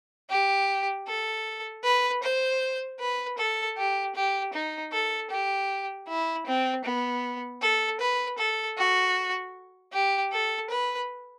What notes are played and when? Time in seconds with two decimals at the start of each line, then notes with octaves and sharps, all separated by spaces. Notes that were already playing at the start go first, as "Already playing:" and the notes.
0.30 G4
1.08 A4
1.84 B4
2.23 C5
3.00 B4
3.38 A4
3.77 G4
4.15 G4
4.53 D#4
4.92 A4
5.31 G4
6.09 E4
6.47 C4
6.85 B3
7.62 A4
8.01 B4
8.38 A4
8.78 F#4
9.93 G4
10.32 A4
10.70 B4